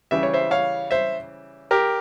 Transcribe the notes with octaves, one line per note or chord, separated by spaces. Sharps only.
C#3 E3 G3 E5
C#5
C5 E5
C#5 F5
C5 E5
G4 A#4